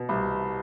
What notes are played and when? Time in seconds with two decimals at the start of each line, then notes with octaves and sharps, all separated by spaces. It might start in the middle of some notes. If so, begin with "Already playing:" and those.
Already playing: B2
0.09 C2